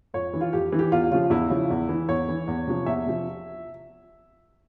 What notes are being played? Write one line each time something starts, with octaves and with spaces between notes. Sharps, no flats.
F2 C#5
E3
F4
F2 G4
E3
G4
E2 F4
C#3 F3 F4
E2 E4
C#3 F3
E2
E3
E2 C#5
E3
E2
C3 F3
E2 E5
C3 F3